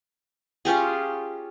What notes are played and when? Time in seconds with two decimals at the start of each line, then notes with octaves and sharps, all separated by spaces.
0.65 C#4 F4 G4 G#4